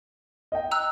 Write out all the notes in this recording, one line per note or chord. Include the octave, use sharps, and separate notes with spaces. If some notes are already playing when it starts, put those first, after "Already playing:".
D#5 G5
A#5 E6 F#6